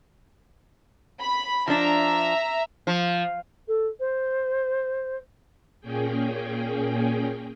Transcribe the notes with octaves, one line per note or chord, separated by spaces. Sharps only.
B5
F3 D4 E5 A#5
F3
A4
C5
A#2 A#3 C#4 G#4 G5